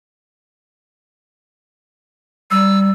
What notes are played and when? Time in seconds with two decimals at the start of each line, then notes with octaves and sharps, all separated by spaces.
2.51 G3 E6